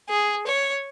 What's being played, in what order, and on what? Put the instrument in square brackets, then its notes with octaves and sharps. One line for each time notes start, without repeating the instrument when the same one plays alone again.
[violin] G#4
C#5